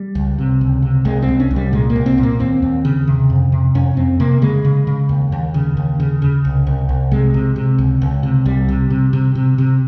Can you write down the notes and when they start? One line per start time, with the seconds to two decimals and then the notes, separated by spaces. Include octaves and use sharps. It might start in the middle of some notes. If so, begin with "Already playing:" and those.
Already playing: G3
0.15 C#2
0.38 C3
0.61 C#2
0.82 C3
1.05 C2 G#3
1.22 C4
1.28 C2
1.40 C#4
1.51 C2
1.56 G3
1.73 A#2 G#3
1.90 A#3
1.96 C2
2.06 C4
2.18 A#2
2.23 A#3
2.40 D#2 C4
2.62 D#2
2.85 C#3
3.08 C3
3.30 F2
3.52 C3
3.75 F2 C#4
3.97 F2 C4
4.20 C3 A#3
4.42 C#3 G#3
4.65 C#3
4.87 C#3
5.09 D#2
5.32 D#2
5.54 C#3
5.77 D#2
6.00 C#3
6.22 C#3
6.45 C2
6.67 C2
6.89 C2
7.11 C3 G#3
7.34 C3
7.56 C3
7.78 C#2
8.02 C#2
8.23 C3
8.45 C2 G3
8.69 C3
8.90 C3
9.13 C3
9.35 C3
9.58 C3